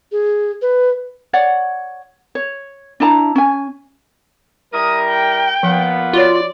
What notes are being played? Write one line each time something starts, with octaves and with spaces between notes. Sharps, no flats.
G#4
B4
C#5 D5 F#5
C#5
D4 E4 A5 A#5
C#4 G#5
G3 E4 A#4 D#6
G5
A#2 F3 B3
F4 F#4 C#5 D5